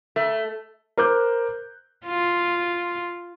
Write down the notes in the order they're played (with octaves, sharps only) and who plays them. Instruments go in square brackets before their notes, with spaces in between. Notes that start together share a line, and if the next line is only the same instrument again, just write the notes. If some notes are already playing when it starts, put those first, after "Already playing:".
[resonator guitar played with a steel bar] A3
[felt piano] A#4 C5 D6 F#6 G6
[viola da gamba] F4